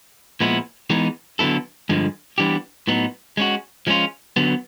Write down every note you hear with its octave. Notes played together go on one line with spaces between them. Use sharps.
A#2 F3 G#3 B3 E4
E3 G#3 B3 D#4
D3 F#3 B3 E4 A4
G2 D3 F3 G#3
E3 G3 B3 D4 G4
A2 F#3 B3 D#4
G#3 C#4 F#4
F3 G#3 C#4 F4
D3 F#3 B3